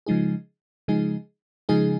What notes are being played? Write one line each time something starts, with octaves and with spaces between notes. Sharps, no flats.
C#3 F3 G#3 D#4 G#4
C#3 F3 G#3 D#4 G#4
C#3 F3 G#3 D#4 G#4